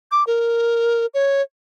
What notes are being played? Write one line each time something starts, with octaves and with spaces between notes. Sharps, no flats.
D6
A#4
C#5